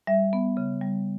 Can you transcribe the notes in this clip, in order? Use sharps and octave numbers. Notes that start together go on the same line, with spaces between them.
G3 E5
B3
C#3
G3